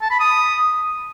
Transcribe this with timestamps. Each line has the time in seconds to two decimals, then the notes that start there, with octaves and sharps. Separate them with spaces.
0.01 A5
0.10 B5
0.20 D#6